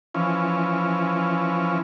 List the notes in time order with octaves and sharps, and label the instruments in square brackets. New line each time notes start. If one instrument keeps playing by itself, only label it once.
[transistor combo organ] E3 F3 C#4